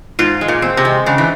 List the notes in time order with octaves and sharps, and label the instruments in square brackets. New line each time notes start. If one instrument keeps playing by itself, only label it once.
[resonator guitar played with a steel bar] G#2 [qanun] F4
[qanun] G#3
[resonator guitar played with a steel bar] A#2
[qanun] C4
[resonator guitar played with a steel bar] C3
[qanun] G#3
[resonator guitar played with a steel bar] C#3 [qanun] D4
[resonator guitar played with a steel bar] E3